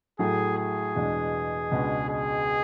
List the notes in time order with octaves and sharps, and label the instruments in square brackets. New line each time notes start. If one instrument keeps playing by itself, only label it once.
[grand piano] A2 F#3 A3 [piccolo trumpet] G#4
[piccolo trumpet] G#4
[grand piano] E2 B2 G#3 D4
C#2 B2 G#3 B3 D4
[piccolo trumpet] G#4